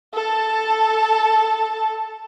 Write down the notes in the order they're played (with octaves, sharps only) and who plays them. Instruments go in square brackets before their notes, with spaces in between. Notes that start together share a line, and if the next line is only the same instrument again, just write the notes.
[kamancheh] A4 A5